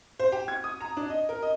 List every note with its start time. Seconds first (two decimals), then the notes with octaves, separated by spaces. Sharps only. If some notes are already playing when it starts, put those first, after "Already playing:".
0.19 C5
0.32 G4
0.48 G#6
0.64 D#6
0.81 A#5
0.97 D4
1.10 D#5
1.29 A#4
1.42 D#5